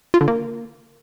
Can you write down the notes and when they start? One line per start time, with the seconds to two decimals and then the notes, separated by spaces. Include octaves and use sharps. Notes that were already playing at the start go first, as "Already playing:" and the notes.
0.14 F4
0.21 D3
0.28 A#3